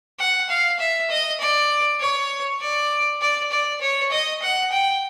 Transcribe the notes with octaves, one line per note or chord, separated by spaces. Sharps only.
F#5
F5
E5
D#5
D5
C#5
D5
D5
D5
C#5
D#5
F#5
G5